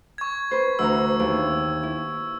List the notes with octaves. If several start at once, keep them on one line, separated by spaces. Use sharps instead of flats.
C#6 G#6
B4 C5
D2 E3 A#5 E6
D#2
E4